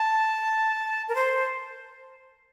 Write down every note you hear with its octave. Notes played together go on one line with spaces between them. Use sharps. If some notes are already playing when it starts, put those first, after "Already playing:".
Already playing: A5
A#4
C5